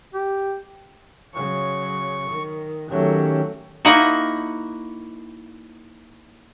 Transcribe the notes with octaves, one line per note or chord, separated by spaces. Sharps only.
G4
C#3 F#3 C#6
D#3
D#3 F#3 A3 C#4 G4
A#3 D#4 E4 F#4 E5